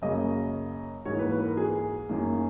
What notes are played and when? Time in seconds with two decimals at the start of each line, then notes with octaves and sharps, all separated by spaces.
0.02 F#2 C#3 F#3 A#3 D#5
1.05 G#2 E3 A#3 C#5
1.19 B4
1.31 B4
1.45 A#4
1.57 G#4
2.09 F#2 D#3 A#3